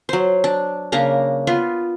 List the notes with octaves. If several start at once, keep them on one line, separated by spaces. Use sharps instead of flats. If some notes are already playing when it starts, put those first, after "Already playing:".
F#3 C5
D4
C#3 A#3 D4 A#5
B3 F4